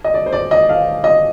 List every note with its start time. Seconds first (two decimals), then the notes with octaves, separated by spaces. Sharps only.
0.04 D#5
0.14 D5
0.26 C5
0.33 D5
0.51 D#5
0.69 F5
1.04 D#5